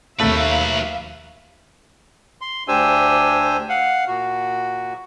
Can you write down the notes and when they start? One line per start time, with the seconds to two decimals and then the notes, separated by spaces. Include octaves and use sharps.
0.20 D#2 F#3 A3 B4 E5 F5
2.41 C6
2.68 D2 D4 G4 C5 G#5 E6
3.69 F5 F#5
4.08 A#2 F#4